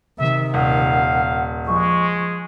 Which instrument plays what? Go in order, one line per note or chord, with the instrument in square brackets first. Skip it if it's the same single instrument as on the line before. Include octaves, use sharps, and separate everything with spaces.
[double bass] C3 D#3 [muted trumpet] E5
[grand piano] D#1 [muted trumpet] F5 [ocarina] F#5
[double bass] F3 [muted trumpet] G#3 [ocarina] C#6